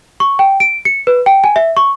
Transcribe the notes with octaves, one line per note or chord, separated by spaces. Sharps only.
C#6
G5
D7
C#7
B4
G5
G#5
E5
C#6